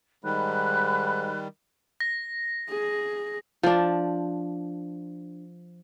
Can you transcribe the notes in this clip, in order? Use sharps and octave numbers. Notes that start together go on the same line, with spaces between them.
G#2 D#3 G3 B5 F#6
A#6
G#4
F3 D4